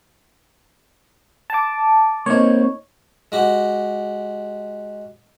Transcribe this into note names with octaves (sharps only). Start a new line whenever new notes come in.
A5 D6
A#3 C4 D#4 C#5
G#3 F#4 G4